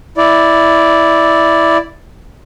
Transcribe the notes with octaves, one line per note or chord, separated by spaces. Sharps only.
E4 D5